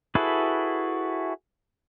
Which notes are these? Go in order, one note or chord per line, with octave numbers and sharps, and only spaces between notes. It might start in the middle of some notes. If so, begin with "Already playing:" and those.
E4 F#4 G#4 A4 B4